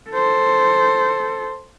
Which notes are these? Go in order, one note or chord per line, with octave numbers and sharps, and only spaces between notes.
A4 C5